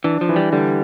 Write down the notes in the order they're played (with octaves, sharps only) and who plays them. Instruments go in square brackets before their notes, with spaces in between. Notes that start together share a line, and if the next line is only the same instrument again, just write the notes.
[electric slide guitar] E3 [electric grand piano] D4
[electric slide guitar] F3
[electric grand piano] E3
[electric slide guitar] G3
[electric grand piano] D3 [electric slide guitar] G3